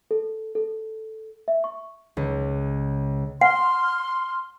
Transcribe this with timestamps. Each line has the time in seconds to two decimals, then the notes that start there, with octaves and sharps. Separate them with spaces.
0.11 A4
0.55 A4
1.48 E5
1.64 C#6
2.17 C#2
3.41 F#5 C6 F6